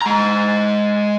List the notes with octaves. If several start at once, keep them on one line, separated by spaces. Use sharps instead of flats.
G#3 A#5